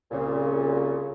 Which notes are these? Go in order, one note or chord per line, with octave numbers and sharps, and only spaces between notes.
C2 A#2 C#3